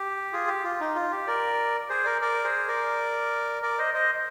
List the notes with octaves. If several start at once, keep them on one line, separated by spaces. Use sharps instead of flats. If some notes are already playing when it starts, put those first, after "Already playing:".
Already playing: G4
F4 G#4
G4
F4
D#4
F4
G4
A#4 D5
G#4 C5
A#4 D5
A#4 D5
G#4 C5
A#4 D5
A#4 D5
C5 D#5
C5 D#5